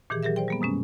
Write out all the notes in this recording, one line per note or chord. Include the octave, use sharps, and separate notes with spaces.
A#2 D#3 E3 G4 G#4
F#3 G4 G#4 A#4 E5
C5 D5 G5
G3 A#3 B3
F#2 B2 G#3 C#4